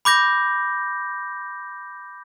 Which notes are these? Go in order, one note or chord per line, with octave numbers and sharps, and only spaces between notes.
B5 D6 G6 A#6